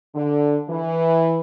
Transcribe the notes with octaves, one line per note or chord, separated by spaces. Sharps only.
D3
E3